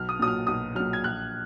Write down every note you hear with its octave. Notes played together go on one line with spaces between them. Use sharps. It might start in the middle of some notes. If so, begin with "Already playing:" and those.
Already playing: B1 F6
D#6
A#2 F#3 D#6
F6
B1 D#6
A#2 F#3 F6
G#6
A#1 F#6